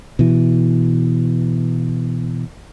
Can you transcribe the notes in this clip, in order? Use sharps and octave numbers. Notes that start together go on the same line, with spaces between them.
B2 E3